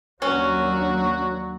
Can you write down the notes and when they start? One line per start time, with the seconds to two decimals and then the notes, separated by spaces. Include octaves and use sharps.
0.22 D#2 F#3 C#4 D4 F#4